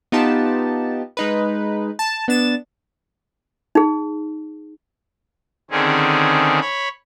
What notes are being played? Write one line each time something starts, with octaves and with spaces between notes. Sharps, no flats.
B3 D#4 F4 G4 A5
G#3 D#4 B4
A5
B3 D4 A6 E7
D#4 G#4
D3 D#3 C4 C#4 G#4
C#5 B5